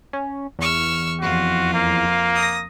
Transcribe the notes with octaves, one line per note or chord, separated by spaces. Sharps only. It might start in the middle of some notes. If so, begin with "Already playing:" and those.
C#4
E2 C#6 E6 F6
F2 F4 F#4
A#3
D#6 A#6